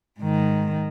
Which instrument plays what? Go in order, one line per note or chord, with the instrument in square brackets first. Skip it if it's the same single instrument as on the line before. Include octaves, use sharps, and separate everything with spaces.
[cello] G#2 D#3